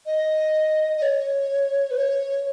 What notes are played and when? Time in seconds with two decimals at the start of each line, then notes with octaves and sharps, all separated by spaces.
0.06 D#5
0.97 D#5
1.02 C#5
1.91 B4
1.97 C#5